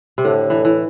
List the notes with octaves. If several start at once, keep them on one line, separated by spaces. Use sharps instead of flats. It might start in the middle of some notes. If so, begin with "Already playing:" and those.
C3
A2 D3
E3
E3